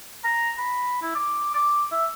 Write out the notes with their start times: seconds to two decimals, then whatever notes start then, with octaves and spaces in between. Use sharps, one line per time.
0.24 A#5
0.58 B5
1.02 E4
1.15 D6
1.54 D6
1.91 E5